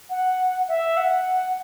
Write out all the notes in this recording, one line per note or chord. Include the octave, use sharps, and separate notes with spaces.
F#5
E5
F#5